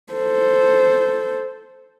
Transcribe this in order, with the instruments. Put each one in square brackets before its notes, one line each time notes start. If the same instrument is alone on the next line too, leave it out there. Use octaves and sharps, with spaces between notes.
[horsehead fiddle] A4 C5